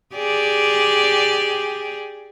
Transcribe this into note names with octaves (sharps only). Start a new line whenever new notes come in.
G4 G#4 D5